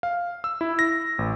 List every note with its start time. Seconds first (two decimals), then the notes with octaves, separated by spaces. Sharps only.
0.03 F5
0.44 E6
0.61 E4
0.79 A#6
1.19 A1